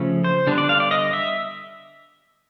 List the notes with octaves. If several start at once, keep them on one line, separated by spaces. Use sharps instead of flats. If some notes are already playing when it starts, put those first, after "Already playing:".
Already playing: C#3 F3 A3 C#4
C5
D3 G3 B3 D4
D5
F5
D5
D#5
E5